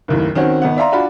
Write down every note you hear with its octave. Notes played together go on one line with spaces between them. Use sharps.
F#1 D#2 A2
D#3 C4 C#4 F#4
G#1 B3 F#5
D5 E5 F5 A#5 C6
D4 F4 F#4 B5